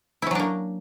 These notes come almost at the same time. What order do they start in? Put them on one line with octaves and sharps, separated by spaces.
E4 C#4 F#3 D4 A#3